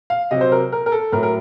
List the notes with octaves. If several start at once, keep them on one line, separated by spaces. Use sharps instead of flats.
F5
C3 F#3 D#5
C5
A#4
A#4
A#4
A4
A2 F#3 A#4
A#4